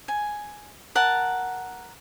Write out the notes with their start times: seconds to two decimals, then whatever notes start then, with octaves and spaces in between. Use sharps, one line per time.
0.08 G#5
0.95 A#4 F#5 A5